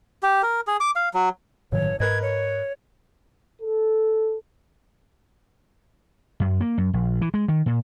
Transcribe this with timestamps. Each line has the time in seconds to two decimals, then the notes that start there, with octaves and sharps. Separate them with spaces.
0.23 G4
0.43 A#4
0.67 G#4
0.80 D6
0.96 F5
1.14 F#3
1.72 G1 A2 D#3 F#3 C#5
2.00 G#2 A#4 B4 D#5 G#6
2.22 C#5
3.62 A4
6.40 F#2
6.61 A#3
6.78 F#2
6.94 A#1
7.21 E3
7.34 G#3
7.48 D#3
7.66 A#2